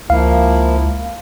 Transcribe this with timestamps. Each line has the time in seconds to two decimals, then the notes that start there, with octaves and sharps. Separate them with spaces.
0.10 C#2 F3 A#3 E4 F5